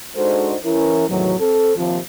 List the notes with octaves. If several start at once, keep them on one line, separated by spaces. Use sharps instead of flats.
G#3 D4 D#4 F#4 A4 C5
E3 C#4 E4 A#4
E2 A2 C3 D#3 E3 F#3
C4 A4
D#2 C3 F3